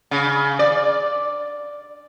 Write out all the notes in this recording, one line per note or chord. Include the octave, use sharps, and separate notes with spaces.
C#3
D5